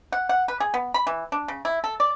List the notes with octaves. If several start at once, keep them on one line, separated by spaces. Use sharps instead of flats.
F#5
F#5
B4
G#4
B3
B5
E3
D4
C#3
E4
A4
D5